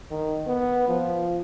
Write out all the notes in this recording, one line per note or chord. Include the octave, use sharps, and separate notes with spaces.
D#3
B3
F3